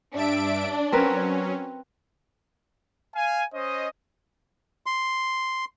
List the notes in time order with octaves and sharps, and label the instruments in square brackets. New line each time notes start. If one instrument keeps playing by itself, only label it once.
[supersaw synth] G2 E5 D7 [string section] D4
[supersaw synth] F#3 C#4 [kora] C4 A#4 B4
[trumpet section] F5 G#5
C#4 C5 D#5
[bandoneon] C6